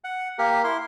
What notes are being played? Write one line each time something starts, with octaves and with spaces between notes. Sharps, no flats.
F#5
A#3 G4 A#4
E4 C6